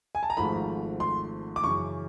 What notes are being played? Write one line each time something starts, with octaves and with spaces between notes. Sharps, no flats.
G#5
A5
A#5
G#1 G#2 F3 A3 B5
C6
D6
F#2 C#3 E3 C#6